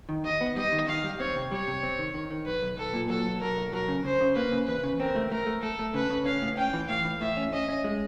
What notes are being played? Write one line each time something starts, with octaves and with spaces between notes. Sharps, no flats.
D#3
D#2 D#5
B3
G3 D#5
D#3
D#3 F5
G3
C4 C#5
C3
G3 C#5
C3
C4
D#3
D#3
D#3
B1 B4
B1
B1 A4
A#2
F#3 A4
B1
F#3 A#4
B1
F#3 A#4
C#3
C#3 C5
C#3
A#3 B4
C#3
E2 B4
C#3
C4 A#4
A3
A3 A#4
A3
A3 A4
A3
C#3 B4
C#3
C#4 F5
A2
C#4 G5
E3
A2 F5
E3
A2 E5
C#4
C#4 D#5
C#4
G#3